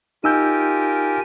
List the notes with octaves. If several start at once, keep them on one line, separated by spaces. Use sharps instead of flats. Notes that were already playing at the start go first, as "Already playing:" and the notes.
D#4 F4 G4 A#4 G#5 E6 G6